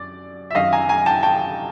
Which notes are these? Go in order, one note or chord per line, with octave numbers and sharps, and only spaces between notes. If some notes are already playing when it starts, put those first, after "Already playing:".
Already playing: F#2 D5
E5
F#2 D#3 D#5 F5
G#5 A#5
G#5 A#5
G5 A5
G5 A5